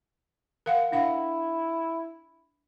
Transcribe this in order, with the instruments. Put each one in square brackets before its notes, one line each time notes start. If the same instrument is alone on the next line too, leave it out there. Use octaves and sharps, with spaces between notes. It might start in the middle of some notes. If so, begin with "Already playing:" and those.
[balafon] A#4 F5 F#5
[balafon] D4 F5 F#5 [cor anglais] E4